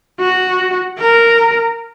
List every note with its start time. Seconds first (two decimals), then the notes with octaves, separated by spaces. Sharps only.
0.20 F#4
1.00 A#4